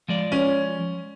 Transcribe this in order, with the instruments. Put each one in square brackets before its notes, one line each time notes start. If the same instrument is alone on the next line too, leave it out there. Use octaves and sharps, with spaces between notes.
[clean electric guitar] F3 G#3 D5
[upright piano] C#4